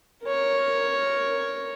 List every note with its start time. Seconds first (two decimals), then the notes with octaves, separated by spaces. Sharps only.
0.25 A#4 C#5